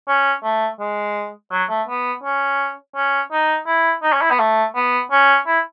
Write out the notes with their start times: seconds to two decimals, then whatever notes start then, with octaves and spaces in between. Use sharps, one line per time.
0.08 C#4
0.44 A3
0.80 G#3
1.52 F#3
1.70 A3
1.88 B3
2.23 C#4
2.96 C#4
3.32 D#4
3.67 E4
4.03 D#4
4.13 C#4
4.21 E4
4.31 B3
4.39 A3
4.75 B3
5.12 C#4
5.47 E4